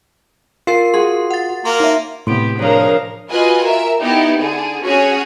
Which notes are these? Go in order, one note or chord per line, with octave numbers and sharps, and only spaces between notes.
F4 A#4 C7
F#4 G#4 C6
F#5 A6
A#3 C6 F6
D#4 E5
A2 C3 B3 G4 C6 D7
F3 D4 G#4 A#4 C5 C#5 F5 A#5
F4 F#4 B4 D#5 G#5
A#4 E5
B3 D#4 E4 G4
D3 G#4
C#4 F#4 G#4 C#5